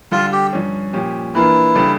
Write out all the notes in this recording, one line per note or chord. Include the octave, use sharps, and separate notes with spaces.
D3 G3 D4 F4 A4
G4
G2 F3 C#4
A#2 F3 C#4 G4
E3 A#3 D4 E4 F4
C#3 G3 D4 A4